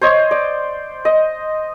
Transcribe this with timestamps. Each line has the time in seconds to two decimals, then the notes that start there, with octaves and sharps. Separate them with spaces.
0.01 C5 C#5 D#5
0.31 D5
1.05 D#5